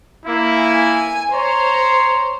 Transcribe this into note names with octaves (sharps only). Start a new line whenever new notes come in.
A#3 E4
G#5
C5 C#5 A#5 C6